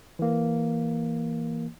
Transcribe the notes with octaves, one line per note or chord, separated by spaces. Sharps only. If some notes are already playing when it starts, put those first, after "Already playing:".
E3 A#3